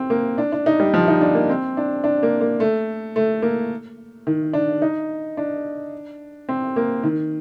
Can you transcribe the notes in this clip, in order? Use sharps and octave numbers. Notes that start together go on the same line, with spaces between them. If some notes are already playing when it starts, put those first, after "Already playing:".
Already playing: C4
A#3
D4
D4
D#4
G3
F3
D#4
D4
A#3
C4
D4
D4
A#3
A#3
A3
A3
A#3
D#3
D4
D#4
D4
C4
A#3
D#3